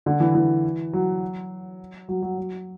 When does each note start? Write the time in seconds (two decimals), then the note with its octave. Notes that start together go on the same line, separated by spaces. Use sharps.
0.06 D3
0.20 E3
0.35 E3
0.93 F#3
2.09 F#3
2.22 F#3
2.38 F#3